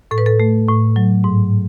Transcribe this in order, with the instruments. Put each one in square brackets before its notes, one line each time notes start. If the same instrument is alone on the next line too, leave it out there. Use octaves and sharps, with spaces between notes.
[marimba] A2 A4
B4
A4
A3
A2
F#3
G#2